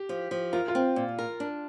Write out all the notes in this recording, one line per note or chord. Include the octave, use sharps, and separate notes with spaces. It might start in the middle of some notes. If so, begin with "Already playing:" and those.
Already playing: G4
F3
F3
F4 A#4
F4
C4
A#2
A#4
D4